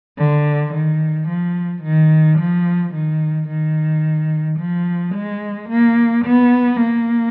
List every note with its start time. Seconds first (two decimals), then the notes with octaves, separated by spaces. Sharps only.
0.18 D3
0.74 D#3
1.29 F3
1.83 D#3
2.39 F3
2.94 D#3
3.49 D#3
4.59 F3
5.15 G#3
5.69 A#3
6.25 B3
6.81 A#3